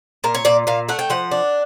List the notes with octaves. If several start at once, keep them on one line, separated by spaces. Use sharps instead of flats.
A#2 A#4
C#5
A#2 D5
A#2 F5
A3 F#5
G5
F3 F#5
D4